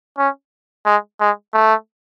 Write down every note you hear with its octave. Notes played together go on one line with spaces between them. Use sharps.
C#4
G#3
G#3
A3